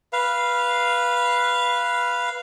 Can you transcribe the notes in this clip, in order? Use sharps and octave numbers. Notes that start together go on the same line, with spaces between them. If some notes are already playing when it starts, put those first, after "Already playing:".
B4 F5